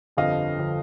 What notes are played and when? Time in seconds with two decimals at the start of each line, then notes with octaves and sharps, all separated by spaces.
0.17 G1 F2 D3 F3 D#5 F5
0.59 D3 F3